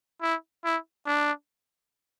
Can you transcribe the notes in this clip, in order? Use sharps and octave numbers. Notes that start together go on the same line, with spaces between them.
E4
E4
D4